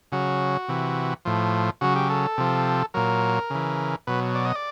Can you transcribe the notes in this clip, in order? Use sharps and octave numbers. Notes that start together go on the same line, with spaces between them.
C#3 F#3 F#4
C3 E3
A2 F3
C#3 F#3 F#4
G4
A4
C3 F3
A#2 F#3 A#4
C#3 E3
B2 F#3 B4
D5
D#5
D5